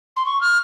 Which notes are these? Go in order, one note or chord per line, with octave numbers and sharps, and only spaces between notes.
C6
C#6
F6